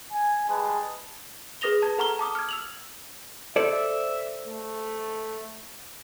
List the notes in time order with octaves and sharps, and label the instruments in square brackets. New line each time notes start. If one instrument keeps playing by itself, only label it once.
[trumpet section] G#5
G3 G#3 G#4 B4 A5
[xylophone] G#4 B4 D#6 A#6 F7 G7
A5 G#6
A4 F#5 A#5 C#6 F6 G7
A5 D6 D#6
F6 G#6
E6 F7 F#7
[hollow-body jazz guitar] A4 C5 D5 [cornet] E5
[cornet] A3